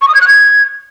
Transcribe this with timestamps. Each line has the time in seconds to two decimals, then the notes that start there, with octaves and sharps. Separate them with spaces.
0.02 C#6
0.08 D#6
0.15 G#6
0.21 F#6
0.28 G#6